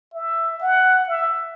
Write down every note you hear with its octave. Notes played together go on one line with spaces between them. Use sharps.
E5
F#5
E5